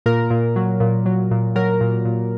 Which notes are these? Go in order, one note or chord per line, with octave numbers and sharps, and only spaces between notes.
A#2 A#4
A#2
F#3
A#2
F#3
A#2
F#3 A#4
A#2
A#2